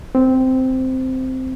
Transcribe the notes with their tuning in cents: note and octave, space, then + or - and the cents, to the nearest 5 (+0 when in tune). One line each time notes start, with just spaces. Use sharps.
C4 -10